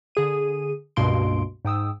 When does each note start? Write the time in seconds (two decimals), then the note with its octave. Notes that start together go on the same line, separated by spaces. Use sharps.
0.15 D3 G#4 D#7
0.96 C#2 G2 B2 A#3 C6 D7
1.65 G#2 G5 D#6 E6